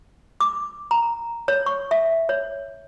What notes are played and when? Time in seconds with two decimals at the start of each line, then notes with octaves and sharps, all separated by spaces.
0.40 D6
0.91 A#5
1.48 C#5
1.66 C#6
1.91 E5
2.29 C#5